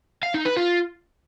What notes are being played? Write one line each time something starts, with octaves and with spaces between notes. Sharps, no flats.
F5
D#4
B4
F4